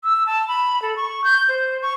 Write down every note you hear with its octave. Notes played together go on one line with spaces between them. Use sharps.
E6
A5
B5
A4
C#6
G6
C5
C#6